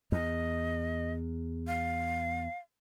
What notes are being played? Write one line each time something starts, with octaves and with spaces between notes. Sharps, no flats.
E2 D#5
F5